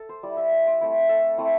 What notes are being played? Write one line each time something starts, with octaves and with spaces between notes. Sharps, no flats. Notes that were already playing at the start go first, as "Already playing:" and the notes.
Already playing: A4
C5
G3 E4 D5
E5
D5
C5
A3 C4 E4
A4
A3 C4 E4